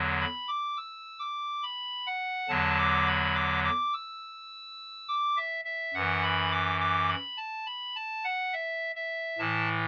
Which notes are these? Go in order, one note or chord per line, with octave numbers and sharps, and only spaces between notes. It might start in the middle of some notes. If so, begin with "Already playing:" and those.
Already playing: E2 D3 F#3
B5
D6
E6
D6
B5
F#5
E2 D3 F#3 A5
D6
B5
D6
D6
E6
D6
E5
E5
F#2 E3 F#5
B5
D6
D6
B5
A5
B5
A5
F#5
E5
E5
A2 E3 A5